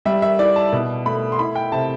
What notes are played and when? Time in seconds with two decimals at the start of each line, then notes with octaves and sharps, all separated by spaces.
0.05 G3 E5
0.22 E5
0.39 E4 D5
0.56 A5
0.73 B2
1.06 A3 B5
1.32 C6
1.39 E4 B5
1.55 G5
1.72 C3 A5